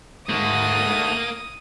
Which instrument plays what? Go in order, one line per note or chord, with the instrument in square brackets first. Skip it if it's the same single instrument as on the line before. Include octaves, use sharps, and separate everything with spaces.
[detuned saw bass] G#2 [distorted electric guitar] A3 F#4 [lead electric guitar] A#3 [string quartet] D#6